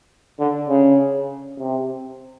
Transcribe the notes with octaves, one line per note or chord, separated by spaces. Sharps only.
D3
C#3
C3